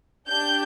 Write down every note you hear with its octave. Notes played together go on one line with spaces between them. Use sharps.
D4 G4 G6